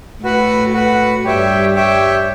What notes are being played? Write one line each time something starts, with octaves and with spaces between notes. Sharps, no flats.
A2 A3 F#4 B4 F#5
F#4 B4 F#5
G2 G3 G4 C#5 E5 G5
G4 C#5 E5 G5